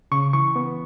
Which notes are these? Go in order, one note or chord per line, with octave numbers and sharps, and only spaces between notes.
C#3 C#6
E3 C#6
B3